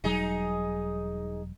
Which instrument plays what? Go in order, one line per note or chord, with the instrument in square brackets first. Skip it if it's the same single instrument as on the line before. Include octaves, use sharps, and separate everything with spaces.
[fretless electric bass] E1 F#3 G3 [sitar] D#4 G#4